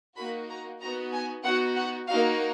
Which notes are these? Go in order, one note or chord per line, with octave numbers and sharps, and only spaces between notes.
A#3 D#4 F#4 B5
A#5
B3 D#4 F#4 A#5
G#5
B3 D#4 F#4 F#5
F#5
A#3 D#4 F#4 F5